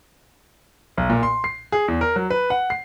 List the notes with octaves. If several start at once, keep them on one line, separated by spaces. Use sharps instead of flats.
B1
A#2
C6
C7
G#4
E2
A#4
F#3
B4
F#5
C7